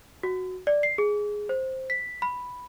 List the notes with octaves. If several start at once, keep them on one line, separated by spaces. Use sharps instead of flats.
F#4
D5
C7
G#4
C5
B6
B5